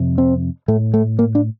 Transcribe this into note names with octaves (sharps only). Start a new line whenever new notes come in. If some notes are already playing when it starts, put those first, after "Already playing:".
Already playing: F2 C3
C4
A2 A3
A3
A#3
D4